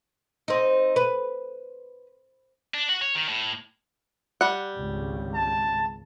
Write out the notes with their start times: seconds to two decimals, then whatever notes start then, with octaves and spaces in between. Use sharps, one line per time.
0.48 C4 D#4
0.96 B4
2.74 D4
2.89 F#4
3.02 C#5
3.15 D#3
3.28 A2
4.41 G3 F#5
4.75 G#1 C#2 C#3
5.34 A5